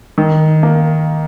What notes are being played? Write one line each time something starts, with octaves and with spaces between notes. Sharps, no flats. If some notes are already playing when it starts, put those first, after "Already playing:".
D#3
A#3